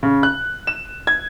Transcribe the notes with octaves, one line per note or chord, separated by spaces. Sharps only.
C#3
F#6
E7
G#6